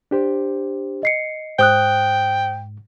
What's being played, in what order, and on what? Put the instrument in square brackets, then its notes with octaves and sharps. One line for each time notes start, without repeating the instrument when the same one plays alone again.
[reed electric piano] D4 G4 C5
[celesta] D#5 C7 C#7
[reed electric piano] G#2 [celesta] C5 D#6 F#6 [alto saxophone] G5